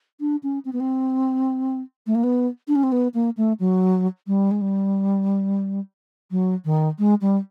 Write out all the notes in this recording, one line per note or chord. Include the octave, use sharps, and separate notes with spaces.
D4
C#4
C4
B3
C4
A3
A#3
B3
D4
C#4
C4
B3
A#3
A3
F#3
G3
G#3
G3
F#3
D#3
G#3
G3